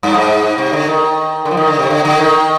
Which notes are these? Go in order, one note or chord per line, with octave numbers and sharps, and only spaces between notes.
G2
G#2
C3
D3
D#3
D3
F3
D#3
D3
C3
D3
D3
D#3